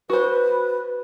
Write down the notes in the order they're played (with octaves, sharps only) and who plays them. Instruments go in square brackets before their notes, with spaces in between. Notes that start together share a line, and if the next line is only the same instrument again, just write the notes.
[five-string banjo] F#4 C5 [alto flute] B4